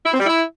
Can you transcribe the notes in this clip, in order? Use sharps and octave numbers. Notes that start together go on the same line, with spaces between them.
E4
C4
G3
E4